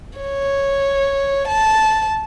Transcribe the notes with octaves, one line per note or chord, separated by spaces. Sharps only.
C#5
A5